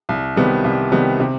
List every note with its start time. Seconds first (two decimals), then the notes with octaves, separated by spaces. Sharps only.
0.09 C2
0.36 C3 D#3 G3 B3
0.64 C2
0.92 C3 D#3 G3 B3
1.20 C3